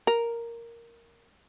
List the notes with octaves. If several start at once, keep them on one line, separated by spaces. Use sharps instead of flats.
A#4